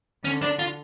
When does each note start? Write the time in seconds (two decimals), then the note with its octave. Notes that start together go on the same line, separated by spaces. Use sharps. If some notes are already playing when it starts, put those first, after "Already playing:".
0.25 D3 C#4
0.42 D4
0.59 F4